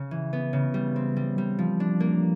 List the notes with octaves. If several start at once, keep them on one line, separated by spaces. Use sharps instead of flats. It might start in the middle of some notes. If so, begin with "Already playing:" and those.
Already playing: C#3
E3
B3
C#3
G3
C4
G3
G3
F3
D4
A#3